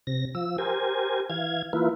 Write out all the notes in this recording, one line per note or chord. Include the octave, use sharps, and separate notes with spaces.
C3 A#6
F3 E6
G4 A#4 C5 G#5
E3 F5 G#6
E3 A#3 E4 F4 B4